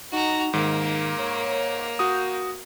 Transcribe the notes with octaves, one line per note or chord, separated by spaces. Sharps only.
D#4 F#4 A#5
G#2 D#3 A#3
C#5
F#4 D#6 G6